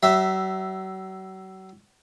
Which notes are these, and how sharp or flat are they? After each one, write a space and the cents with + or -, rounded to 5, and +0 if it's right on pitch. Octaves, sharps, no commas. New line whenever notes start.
F#3 +40 E5 +0